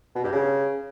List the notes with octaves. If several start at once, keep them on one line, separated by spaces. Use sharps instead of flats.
B2
G2
C#3